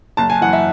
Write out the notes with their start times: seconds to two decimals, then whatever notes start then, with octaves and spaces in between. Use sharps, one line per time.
0.17 F#1 A5
0.30 G#5
0.41 F#2 E3 F#5
0.53 E5